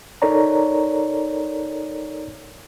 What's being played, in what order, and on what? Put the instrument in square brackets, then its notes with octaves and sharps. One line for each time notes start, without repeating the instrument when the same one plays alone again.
[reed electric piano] D#4 A4 A#4 C#5 D5 A#5